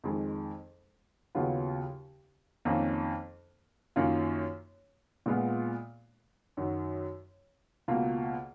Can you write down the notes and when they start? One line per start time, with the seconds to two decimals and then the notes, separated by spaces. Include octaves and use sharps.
0.04 F2 D#3 G#3
1.35 D#2 C#3 F#3 B3 F4
2.65 F2 D#3 A#3 C#4
3.96 F#2 D#3 A#3 C#4 F4
5.26 A#2 G#3 B3 F4
6.57 F#2 D#3 F#3
7.88 C#2 B2 A#3 F4